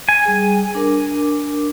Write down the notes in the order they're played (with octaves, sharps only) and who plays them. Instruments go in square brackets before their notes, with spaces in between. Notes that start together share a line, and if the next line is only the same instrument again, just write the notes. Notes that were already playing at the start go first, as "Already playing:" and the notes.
[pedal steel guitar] G#5
[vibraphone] G3 G#4
D4 A#4 D6